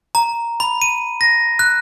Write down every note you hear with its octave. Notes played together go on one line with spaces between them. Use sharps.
A#5
B5
D#7
A#6
F#6